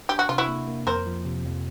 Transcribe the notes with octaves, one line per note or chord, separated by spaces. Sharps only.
D4 G4
F#4
C3 F4
E4 F#4
A#3
A#3
F2 A#4 C5
F3
C3
F2